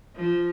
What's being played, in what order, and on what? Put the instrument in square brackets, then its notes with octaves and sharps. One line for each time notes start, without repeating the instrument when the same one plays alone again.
[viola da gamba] F3